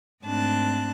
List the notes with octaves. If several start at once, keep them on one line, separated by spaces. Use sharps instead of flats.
G#2 A3 C4 D4 A5 F#6